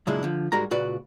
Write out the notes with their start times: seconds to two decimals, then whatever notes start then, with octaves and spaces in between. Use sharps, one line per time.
0.07 F#2 A#2 C#3 G#3 D4 E4
0.23 D3 F3
0.52 G#2 G3 G#3 F#4 A#4 A#5
0.71 C#2 A#2 F#4 B4 D5